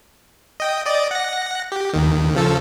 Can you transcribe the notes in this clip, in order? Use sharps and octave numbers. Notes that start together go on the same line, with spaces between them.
D#5 G5
D5 D#5
F#5 A#6
G4
D#2 D#3
C#3 F3 A4